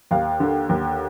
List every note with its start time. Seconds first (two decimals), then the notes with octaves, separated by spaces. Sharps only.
0.11 D#2 F5
0.40 D3
0.69 D#2